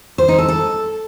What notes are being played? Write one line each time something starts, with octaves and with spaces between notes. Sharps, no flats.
C5
D#4
A4
A4